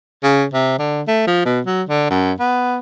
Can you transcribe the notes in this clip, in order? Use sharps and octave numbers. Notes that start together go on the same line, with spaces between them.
C#3
C3
D3
A3
F3
B2
F#3
D3
F#2
B3